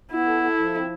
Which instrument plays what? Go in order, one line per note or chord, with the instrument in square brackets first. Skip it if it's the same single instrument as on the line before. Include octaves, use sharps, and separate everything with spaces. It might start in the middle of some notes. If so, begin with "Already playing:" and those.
[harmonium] B3 [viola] E4
[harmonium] A4
A4
F3
C4